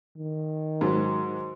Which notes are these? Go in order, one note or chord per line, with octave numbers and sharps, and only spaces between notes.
D#3
G#2 F#3